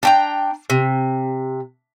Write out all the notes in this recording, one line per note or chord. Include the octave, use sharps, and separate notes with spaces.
D4 G5 A#5
C3